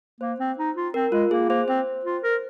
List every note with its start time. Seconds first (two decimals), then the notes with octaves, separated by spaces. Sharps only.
0.20 A#3 C5
0.39 C4
0.58 D#4
0.76 F4
0.94 C4 A#4
1.12 G#3 F4
1.31 A#3 G#4
1.49 A#3 C5
1.68 C4 C5
2.05 F4
2.23 A#4